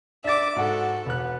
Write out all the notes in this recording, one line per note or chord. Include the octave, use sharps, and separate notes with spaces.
D4 E5 D6 A6
G#2 F#4 A4 F#5
E1 B3 F#6